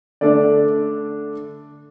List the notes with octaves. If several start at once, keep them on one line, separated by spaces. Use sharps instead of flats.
D3 A3 D4 D5